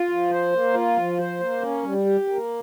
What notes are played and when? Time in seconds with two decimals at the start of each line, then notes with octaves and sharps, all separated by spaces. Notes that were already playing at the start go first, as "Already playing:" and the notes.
Already playing: F4
0.09 F3
0.31 C5
0.53 A#3
0.74 F4
0.97 F3
1.18 C5
1.40 A#3
1.61 C#4
1.84 G3
2.05 G4
2.28 A#3